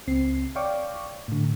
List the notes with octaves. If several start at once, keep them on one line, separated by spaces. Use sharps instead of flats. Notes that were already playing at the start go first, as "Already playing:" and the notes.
C#2 C4 C7
C#5 D5 F5 G5 C#6 D6
A2 D3